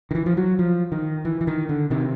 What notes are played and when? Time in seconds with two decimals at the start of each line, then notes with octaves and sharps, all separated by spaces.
0.11 D#3
0.15 E3
0.26 F3
0.37 F#3
0.59 F3
0.92 D#3
1.25 E3
1.41 E3
1.47 D#3
1.69 D3
1.90 C3 D#3